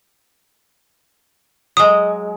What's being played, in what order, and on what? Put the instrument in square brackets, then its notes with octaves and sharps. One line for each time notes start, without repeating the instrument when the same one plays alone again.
[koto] F#3 G#3 [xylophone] D#6